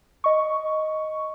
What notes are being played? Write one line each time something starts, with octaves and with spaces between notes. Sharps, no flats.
D#5 C#6